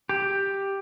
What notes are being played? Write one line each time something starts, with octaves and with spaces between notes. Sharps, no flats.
G4